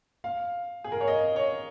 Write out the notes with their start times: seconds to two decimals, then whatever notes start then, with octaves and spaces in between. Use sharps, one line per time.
0.24 F5
0.84 G#4
0.92 A#4
1.01 C#5
1.08 D#5
1.36 C#5